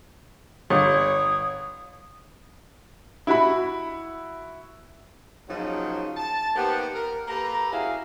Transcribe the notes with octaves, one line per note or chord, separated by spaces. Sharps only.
G1 C#5 D#6
E4 F#4 B5
A#2 C#3 F3 F#3 D#4
A5
A#3 B3 D#4 G4 C5 F#5
A#4
A#3 G4 A4 B4 A#5
C#4 E4 F#4 G#4 F5